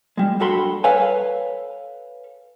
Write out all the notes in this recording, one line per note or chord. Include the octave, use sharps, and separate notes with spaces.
G3 G#3
G2 F#4 A4 B5 C6
A4 B4 C#5 F5 G#5